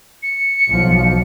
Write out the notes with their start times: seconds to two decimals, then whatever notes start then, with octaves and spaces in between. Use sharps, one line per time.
0.23 C#7
0.68 B1 F3